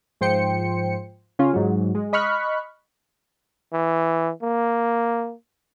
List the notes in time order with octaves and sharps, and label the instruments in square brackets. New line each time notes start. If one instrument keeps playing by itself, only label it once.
[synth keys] G#2 F3 C5 G5 C#7
C#3 C#4 F4
G#2 F#3
G#3
D#5 B5 C#6 F6 F#6
[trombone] E3
A#3